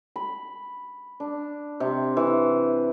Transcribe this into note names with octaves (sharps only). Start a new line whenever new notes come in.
B5
D4
C3
E3